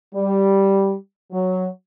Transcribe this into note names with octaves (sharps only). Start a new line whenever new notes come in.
G3
F#3